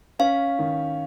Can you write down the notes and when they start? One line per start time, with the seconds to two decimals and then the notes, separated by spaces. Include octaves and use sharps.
0.19 C#4 F5
0.59 D#3